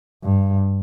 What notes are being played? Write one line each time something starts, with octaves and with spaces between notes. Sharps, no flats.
G2